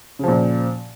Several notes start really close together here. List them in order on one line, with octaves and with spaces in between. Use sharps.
C#3 F3 A#2